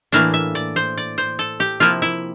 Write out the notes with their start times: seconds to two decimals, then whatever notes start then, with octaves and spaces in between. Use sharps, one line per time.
0.12 A2 E3 A#3 D4 F5
0.34 E5
0.55 D5
0.76 C5
0.97 D5
1.18 C5
1.39 A4
1.60 G4
1.80 C3 F3 A#3 E4 F4
2.02 E4